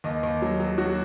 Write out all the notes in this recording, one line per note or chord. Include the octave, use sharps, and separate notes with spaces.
D#2 D#5
D#2
F#3
F#3
F#3 F#4